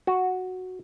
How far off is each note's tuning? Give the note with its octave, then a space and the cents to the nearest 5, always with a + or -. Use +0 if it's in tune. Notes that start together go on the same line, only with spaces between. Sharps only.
F#4 -5